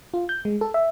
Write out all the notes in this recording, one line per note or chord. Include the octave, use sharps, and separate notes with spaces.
F4
G6
G#3
A4
E5